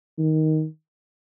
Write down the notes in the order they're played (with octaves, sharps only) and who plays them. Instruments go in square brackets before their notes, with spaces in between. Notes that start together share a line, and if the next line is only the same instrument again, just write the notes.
[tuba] D#3